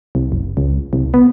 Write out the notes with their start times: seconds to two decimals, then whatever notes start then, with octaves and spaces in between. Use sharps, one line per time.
0.15 C2
0.32 F#1
0.57 C#2
0.93 C2
1.14 B3